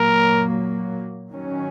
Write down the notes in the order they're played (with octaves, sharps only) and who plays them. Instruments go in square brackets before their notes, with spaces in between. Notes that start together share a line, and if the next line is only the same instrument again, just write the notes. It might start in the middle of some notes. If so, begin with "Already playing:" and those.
Already playing: [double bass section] A#2 F#3 A#3 [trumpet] A#4
[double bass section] D#3 F#3 C#4